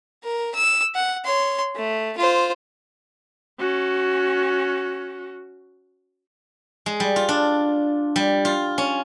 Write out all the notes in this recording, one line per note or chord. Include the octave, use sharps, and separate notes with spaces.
A#4
E6
F#5
C#5 C6
A3
F4 C5
C#4 F#4
G#3
G3
F4
D4
G3
F4
C#4